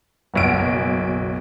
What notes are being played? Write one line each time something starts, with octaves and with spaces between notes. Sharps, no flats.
F#1 B1 D7